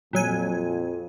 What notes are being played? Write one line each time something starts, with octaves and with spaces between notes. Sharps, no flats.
F2 A#2 F#3 G#5